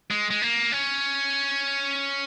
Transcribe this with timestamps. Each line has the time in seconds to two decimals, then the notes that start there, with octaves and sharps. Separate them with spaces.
0.11 G#3
0.30 G#3
0.42 A#3
0.72 C#4